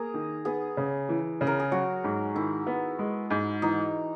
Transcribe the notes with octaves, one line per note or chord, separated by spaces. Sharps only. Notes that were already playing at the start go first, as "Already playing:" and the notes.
Already playing: A#3 G#4 A#4
D#3
B3 G#4
C#3
E3
C#3
A#4
G#4
F#3 F#4
G#2
D#3 E4
B3
G#3
G#2
E3 D#4